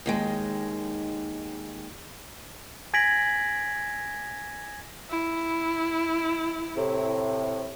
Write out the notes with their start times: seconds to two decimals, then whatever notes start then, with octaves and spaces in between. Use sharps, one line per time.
0.06 D#2 D#3 G#3
2.94 G#5 G#6 A#6 B6 D7 F#7
5.10 E4
6.77 A2 C3